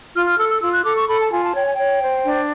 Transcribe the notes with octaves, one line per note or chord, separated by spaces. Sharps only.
F4 F6
F6
A4 E6
E6
F4 E6
F#6
A4 D6
C#6
A4 B5
A5
F4 G#5
A5
C#5 G5
G#5
C#5 G5
C5
D4